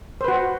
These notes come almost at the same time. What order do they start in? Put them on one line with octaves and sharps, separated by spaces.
C5 B4 F#4